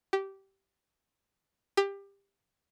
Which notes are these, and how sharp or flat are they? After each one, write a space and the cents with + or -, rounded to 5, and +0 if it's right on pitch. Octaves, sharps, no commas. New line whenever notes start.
G4 -15
G4 +20